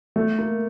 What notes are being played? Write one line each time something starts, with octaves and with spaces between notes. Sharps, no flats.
A3
A#3